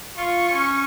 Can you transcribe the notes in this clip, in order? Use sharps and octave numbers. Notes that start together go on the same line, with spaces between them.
F4 C#6
C#4